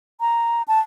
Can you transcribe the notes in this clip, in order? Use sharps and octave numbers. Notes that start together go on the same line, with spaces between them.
A#5
A5